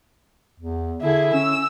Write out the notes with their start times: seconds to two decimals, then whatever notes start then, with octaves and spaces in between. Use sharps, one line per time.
0.60 E2
1.02 D3 E4 G#4
1.34 C#4 E6